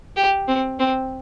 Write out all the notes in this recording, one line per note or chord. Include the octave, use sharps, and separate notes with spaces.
G4
C4
C4